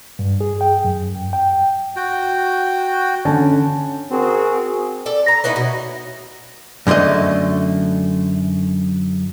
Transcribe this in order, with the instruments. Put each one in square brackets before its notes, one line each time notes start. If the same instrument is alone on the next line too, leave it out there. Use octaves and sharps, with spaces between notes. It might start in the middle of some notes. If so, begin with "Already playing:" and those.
[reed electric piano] G2
G#4
G5
F#2
G5
[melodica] F#4 G5
[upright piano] D3 C#4 A5
[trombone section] C4 F#4 G#4 A#4
[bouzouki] A4 D5
A#5
B3 C#4 D#4 E4
B2
[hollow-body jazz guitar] F#2 D3 F3 A3 D#5